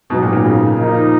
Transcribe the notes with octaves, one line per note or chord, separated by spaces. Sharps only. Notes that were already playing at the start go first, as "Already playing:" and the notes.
G#2 B2 F#3 B3 D#4
A#2
A#2
C#3
F3 A#3 D#4